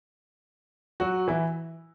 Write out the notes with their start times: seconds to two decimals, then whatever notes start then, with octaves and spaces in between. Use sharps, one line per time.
1.00 F#3 F#4
1.28 E3 E4